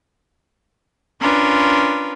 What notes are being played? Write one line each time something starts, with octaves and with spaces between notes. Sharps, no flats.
C#4 D4 F4 A#4 B4